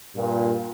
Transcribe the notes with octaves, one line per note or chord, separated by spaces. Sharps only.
G2 A#2